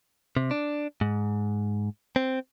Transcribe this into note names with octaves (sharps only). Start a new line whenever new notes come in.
C3
D4
G#2
C4